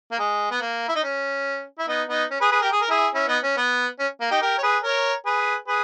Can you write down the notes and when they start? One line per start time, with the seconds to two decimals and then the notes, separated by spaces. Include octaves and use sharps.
0.12 A#3
0.19 G#3
0.51 B3
0.61 A#3
0.88 E4
0.96 D#4
1.03 C#4
1.79 E4
1.88 B3 D#4
2.09 B3 D#4
2.31 C#4
2.41 G#4 B4
2.51 G#4 B4
2.61 G4 A#4
2.72 G#4
2.81 A#4
2.90 E4 G#4
3.14 C#4 E4
3.28 B3 D#4
3.43 C#4
3.57 B3
3.99 C#4
4.21 A#3
4.31 D#4 G4
4.41 G4 A#4
4.58 C#5
4.63 G#4 B4
4.83 A#4 C#5
5.25 G#4 B4
5.67 G#4 B4